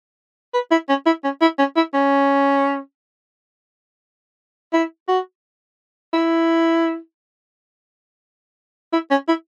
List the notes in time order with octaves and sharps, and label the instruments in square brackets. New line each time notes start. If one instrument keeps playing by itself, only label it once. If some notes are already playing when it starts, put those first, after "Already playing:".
[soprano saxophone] B4
E4
C#4
E4
C#4
E4
C#4
E4
C#4
E4
F#4
E4
E4
C#4
E4